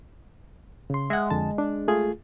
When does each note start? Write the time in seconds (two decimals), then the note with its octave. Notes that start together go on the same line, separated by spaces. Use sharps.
0.90 C#3 C6
1.10 G#3 E5 F#5
1.30 F2 D3 A5
1.58 D4
1.88 A3 F4 G#4